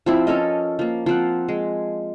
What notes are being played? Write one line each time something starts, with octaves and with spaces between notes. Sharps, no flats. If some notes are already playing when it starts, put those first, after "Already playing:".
F3 C4 E4
C#4 A4 A#4 D#5
F3 A#3
F3 C4 F#5
G#3